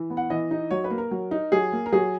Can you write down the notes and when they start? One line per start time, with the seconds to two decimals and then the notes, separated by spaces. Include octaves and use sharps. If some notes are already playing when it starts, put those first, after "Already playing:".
Already playing: E3
0.10 B3
0.17 F#5
0.30 E3 D#5
0.51 D#4
0.71 F#3 C#5
0.84 B4
0.90 A#3
0.98 A#4
1.11 F#3
1.31 D#4
1.52 F#3 G#4
1.73 A#3
1.86 A#4
1.92 F#3 G#4